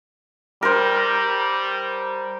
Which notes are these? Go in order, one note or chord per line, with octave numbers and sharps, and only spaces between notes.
G3 A#4 C5